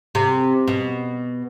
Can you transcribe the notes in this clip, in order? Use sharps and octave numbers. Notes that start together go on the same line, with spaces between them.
C3
B2